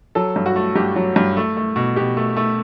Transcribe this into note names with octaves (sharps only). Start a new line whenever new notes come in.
F#3 A4
G2
F#4
A3
G2 G4
F#3
G2
A3
A3
B2
B2 G4
A3
A3